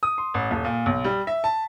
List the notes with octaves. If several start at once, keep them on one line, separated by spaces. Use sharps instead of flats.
D#6
C6
A1
D#1
A#2
B1
G3
E5
A5